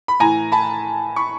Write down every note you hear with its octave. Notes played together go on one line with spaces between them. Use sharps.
B5
A2 E3 G#5 A#5
A5 B5
B5 C#6